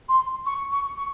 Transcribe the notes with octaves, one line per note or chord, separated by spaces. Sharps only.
C6
C#6
C#6
C#6